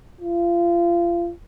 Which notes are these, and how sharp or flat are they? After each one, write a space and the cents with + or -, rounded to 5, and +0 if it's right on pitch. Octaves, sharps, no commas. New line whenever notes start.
F4 -30